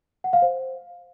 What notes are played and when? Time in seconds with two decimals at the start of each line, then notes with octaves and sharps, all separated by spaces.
0.24 F#5
0.33 F5
0.42 C5